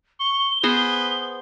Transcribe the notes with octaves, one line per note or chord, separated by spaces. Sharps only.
C#6 G7
B3 G#4 B4 C5